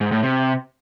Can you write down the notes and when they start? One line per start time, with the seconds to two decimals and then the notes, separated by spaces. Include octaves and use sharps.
0.01 G#2
0.12 A2
0.23 C3